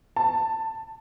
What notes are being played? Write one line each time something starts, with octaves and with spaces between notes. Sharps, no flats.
A5